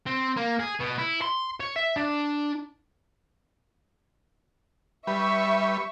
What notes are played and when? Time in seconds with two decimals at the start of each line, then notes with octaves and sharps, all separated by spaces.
0.07 C4
0.37 A#3
0.60 G#4
0.80 B2
0.99 E4
1.22 C6
1.60 C#5
1.76 E5
1.96 D4
5.07 G3 B4 E5 C#6